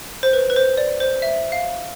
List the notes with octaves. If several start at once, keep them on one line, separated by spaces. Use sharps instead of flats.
C5
B4
B4
C5
D5
C5
E5
F5